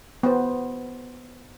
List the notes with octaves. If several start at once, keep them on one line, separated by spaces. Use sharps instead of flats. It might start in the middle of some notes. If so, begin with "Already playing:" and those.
B3 C5